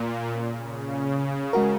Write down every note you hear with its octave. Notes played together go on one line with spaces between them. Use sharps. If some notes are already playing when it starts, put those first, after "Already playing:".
Already playing: A#2
C#3
C#3
G#3 F#4 A#4